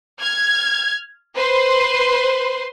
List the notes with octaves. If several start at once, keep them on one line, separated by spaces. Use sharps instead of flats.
F6 G#6
B4 C5 C6